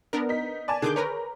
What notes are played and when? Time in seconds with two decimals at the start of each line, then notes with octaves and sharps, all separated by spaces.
0.13 B3 D4 A#4
0.29 D#4 B6
0.68 D5 G#5 A5
0.82 D3 D#3 G#4 D6 G6
0.96 A#4 B4 C#5 A#5